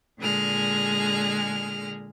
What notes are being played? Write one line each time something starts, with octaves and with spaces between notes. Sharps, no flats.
A#2 D3 G#3 G#4 F6